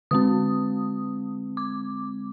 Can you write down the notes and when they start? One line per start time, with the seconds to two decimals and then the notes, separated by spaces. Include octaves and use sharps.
0.11 D3 G#3 C4 D#6
1.57 D6